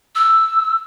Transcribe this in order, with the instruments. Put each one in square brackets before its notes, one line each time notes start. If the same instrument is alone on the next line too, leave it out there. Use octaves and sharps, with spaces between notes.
[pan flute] E6